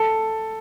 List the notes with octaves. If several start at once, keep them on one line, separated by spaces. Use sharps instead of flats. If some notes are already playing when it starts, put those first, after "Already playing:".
Already playing: A4